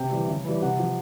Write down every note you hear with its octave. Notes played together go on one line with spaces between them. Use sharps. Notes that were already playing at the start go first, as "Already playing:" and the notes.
Already playing: C3 G5
E3 G3
C#3
E3 G3
C3 F#5
F3